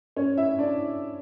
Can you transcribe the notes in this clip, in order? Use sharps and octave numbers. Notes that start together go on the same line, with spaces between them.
C#4 C#5
E4 E5
D4 D5